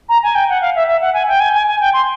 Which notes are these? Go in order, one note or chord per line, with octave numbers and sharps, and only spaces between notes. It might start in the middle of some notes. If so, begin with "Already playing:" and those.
A#5
G#5
G5
F#5
F5
E5
E5
F#5
G#5
G5
G#5
G#5
G#5
G5
C6